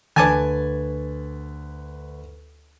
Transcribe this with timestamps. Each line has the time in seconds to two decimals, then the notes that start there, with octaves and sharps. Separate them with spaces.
0.16 D2 B4 G#5 A5 D6